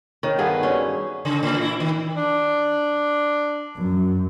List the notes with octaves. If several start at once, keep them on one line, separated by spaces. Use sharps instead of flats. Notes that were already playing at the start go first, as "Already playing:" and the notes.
D#3 C#5 C#6
G2 B3 G#4 A4 F5
C#4 F#4 C#5 D5
C#3
A2
E4
D#3
D4
F#2